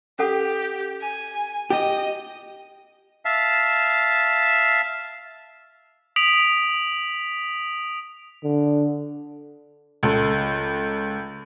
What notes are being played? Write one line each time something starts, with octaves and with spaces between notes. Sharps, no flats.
C#4 G4 A4 F#5
G#5
G4 D#5
E5 F5 A5
D#6 B6 D7 F7 F#7
D3
C#2 A4